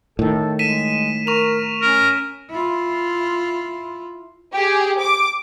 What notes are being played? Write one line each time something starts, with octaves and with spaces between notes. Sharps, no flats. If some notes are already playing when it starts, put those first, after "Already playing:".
A2 D#3 A4
G#3 B6 D#7 E7
A#4 C#6 F7
C#4 A#4
E4 F4
G4 G#4
D6